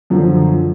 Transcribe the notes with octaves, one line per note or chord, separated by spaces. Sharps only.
F#2 D3 F3